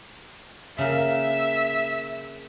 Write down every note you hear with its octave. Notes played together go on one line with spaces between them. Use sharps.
C#3 A#3 E5